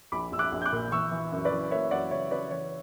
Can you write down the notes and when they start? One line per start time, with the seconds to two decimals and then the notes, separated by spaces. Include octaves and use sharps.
0.12 A#1 B5 D6
0.32 A#1 E6
0.39 D6 F#6
0.52 A#1
0.62 G6
0.65 D6 F#6
0.72 A#2
0.91 E3 C#6 E6
1.11 E3
1.32 F#2
1.45 B4 D5
1.52 E3
1.71 A#3 C#5 E5
1.91 F#2 D5 F#5
2.11 C#3 C#5 E5
2.31 C#3 B4 D5
2.51 E3 C#5